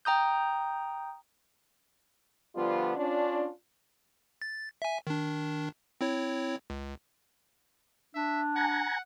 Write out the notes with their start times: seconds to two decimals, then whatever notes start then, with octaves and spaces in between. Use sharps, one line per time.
0.05 G5 A#5 D#6 G6
2.55 D3 F3 G3 B3 F4
2.96 C#4 D4 F4
4.42 A6
4.82 E5 G#5
5.07 D#3 D4
6.01 C4 E4 C#5
6.70 C#2
8.15 D4 E5
8.56 F#5 G#5 A#5